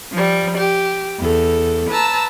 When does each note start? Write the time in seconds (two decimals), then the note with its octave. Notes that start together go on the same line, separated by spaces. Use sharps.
0.12 F3 G3
0.57 G4
1.18 E2 A4
1.90 B4 A5 A#5 E6